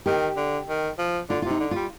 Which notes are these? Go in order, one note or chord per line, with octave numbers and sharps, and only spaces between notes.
D#3 G4
D3
D#3
F3
D3 F4
F4
C3 D#4
D3
G3 F4